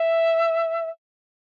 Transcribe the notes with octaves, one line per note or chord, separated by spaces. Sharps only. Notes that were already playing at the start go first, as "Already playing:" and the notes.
Already playing: E5